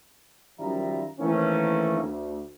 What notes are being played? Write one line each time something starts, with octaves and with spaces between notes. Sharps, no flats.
F#2 D#3 F3 G3 E5 A#5
D#3 E3 A3 A#3 C4 C#4
D2